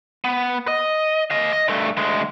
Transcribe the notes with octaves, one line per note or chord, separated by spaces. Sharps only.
B3
D#5
D#5 F5
D#5
G2 A3
D2 G#3